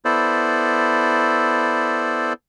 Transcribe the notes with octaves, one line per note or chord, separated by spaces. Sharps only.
B3 E4 A4 C5 D5